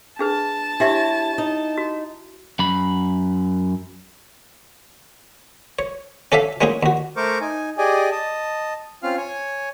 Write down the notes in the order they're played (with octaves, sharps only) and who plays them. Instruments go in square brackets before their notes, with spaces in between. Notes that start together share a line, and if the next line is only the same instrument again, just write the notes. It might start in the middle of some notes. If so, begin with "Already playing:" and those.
[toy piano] D4 G#4 B4 [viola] A5
[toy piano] D4 G4 E5 [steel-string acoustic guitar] E4 C#5
[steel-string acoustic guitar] D#4
[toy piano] F#4
[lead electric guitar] F#2 B5
[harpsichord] C#5
C#4 A4 D5 E5 F5
G#3 A#3 C#4 D#4 G#4
D#2 F#4
[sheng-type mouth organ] A3 A#4 C5 C#6 D6
D#4 G#5
G4 G#4 D5 D#5 G#5
D#5 A5
C4 C#4 F4 F5 F6
C#5 G#5